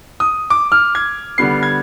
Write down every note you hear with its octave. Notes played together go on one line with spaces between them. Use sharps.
D#6
D6
F6
G#6
D3 G3 B3 C7
G#6